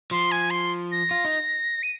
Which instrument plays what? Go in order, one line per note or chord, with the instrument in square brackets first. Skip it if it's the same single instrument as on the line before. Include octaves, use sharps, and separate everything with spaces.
[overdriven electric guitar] F3 [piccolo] C6
[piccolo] G#5
C6
A#6
[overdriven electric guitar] F4
D#4
[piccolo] D#7